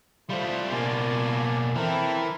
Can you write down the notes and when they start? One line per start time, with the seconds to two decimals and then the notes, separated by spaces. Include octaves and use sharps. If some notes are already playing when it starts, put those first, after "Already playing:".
0.29 G3 A3 F4 C5
0.71 B2 A#3 D5 G#5 A5
1.75 E3 C4 E4 A4 A#4